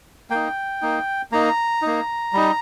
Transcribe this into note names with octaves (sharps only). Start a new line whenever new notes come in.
A#3 D#4 G5
A#3 D#4
A#3 D#4 A#5
A#3 D#4
G3 D#4